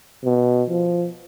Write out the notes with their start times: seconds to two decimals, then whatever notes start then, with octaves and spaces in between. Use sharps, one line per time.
0.24 B2
0.69 F3